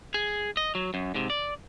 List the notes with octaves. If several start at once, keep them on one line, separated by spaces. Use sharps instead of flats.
G#4
D#5
F#3
F#2
G#2 C3
D5